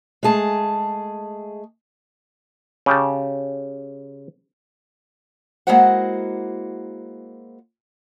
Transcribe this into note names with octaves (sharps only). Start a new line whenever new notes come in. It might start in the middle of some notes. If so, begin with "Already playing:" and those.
G#3 A3 G#4 A5
C#3 G4 A5
G#3 A#3 E4 F#4 C5 F#5